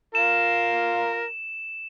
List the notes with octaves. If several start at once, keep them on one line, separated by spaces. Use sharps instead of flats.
F4 A#4 E7